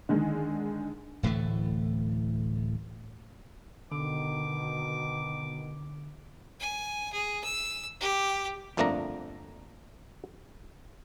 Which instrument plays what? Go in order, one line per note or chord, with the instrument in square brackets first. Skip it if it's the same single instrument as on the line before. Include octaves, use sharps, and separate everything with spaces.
[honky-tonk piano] D3 D#3 G#3
[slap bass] D1 A2 E3 A3
[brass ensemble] B2 D#3 [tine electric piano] D3 [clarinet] D6
[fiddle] G#5
G#4
E6
G4
[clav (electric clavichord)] G1 F2 A3 A#3 D4 A#5